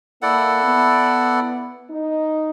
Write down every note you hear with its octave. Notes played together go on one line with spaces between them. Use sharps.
A#3 E4 A4 D5 F#5
B3
D#4